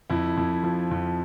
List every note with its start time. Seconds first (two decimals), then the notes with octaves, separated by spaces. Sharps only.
0.10 F2 E4
0.37 F2
0.63 F3
0.91 F2